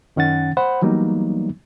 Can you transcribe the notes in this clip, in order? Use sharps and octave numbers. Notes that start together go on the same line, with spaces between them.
F#2 D#3 C#4 F#5 A6
C5 F#5 B5
E3 F#3 G3 A#3 B3 D#4